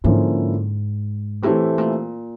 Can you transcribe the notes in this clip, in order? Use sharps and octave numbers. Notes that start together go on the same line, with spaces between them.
G#2 D3 F3 A#3 C#4 E4
A2 E3 A3 C4 E4 G4
A#2